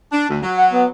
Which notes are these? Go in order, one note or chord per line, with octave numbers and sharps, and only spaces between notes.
D4
D2
F#3
F#5
B3